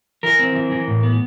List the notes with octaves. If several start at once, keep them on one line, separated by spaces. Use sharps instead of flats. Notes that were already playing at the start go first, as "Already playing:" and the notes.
E3 A#4
C4
E3
E3
A2
B3